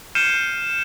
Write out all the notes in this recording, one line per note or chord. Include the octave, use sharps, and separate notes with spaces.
F6 G6 C7 C#7 D#7 E7